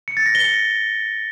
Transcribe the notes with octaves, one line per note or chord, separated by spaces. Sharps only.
C#7
A6
A#6
G7
C#7